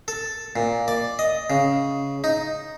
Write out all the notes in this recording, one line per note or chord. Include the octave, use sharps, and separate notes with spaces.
A4
A#2
D5
D#5
C#3
D#4